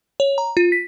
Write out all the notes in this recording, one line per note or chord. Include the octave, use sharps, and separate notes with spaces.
C#5
A#5
F4
B6